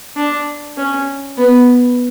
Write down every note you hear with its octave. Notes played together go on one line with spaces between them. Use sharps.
D4
C#4
B3